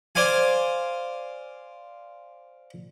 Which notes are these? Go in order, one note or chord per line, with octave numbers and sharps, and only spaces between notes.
C5 D5 F5 G#5